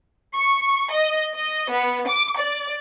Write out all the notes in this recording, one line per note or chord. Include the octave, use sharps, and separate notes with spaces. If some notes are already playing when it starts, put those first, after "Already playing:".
C#6
D#5
D#5
B3
D6
D5